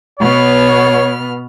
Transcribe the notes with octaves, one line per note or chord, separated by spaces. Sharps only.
B2 B3 C#5 F6